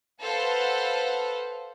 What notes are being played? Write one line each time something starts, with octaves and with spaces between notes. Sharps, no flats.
A4 B4 C5 F5 F#5